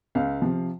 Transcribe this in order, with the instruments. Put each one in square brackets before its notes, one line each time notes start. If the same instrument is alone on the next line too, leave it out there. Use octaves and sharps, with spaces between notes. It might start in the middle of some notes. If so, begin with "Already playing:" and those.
[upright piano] C#2 F5
C3 F3